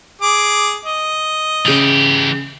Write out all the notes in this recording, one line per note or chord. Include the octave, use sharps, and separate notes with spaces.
G#4 D6
D#5
C#3 E3 G4 F7